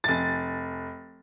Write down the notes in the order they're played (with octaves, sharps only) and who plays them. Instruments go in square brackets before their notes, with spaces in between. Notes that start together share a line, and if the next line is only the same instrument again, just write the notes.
[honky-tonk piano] F1 A6